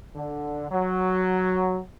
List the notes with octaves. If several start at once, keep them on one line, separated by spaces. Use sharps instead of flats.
D3
F#3